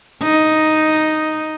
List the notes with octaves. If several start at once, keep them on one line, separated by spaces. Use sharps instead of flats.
D#4